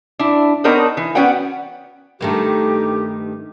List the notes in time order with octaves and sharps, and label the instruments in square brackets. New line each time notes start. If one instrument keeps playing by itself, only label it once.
[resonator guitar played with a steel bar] D4 E4
B3 C4 D4 D#4 A#4 C#5
E3
B3 C#4 F#4 D5 F#5 G5
[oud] G2 D#3 A3 [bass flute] G4